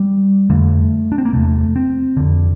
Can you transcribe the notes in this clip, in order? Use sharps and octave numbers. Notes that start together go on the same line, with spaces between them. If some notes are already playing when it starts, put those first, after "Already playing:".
Already playing: G3
F2 D3 A3
D4
C4
A#3
E2 C3 A3
C4
F2 D3